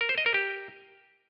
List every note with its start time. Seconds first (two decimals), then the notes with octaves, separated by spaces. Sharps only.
0.01 A#4
0.09 C5
0.18 D#5
0.26 A#4
0.34 G4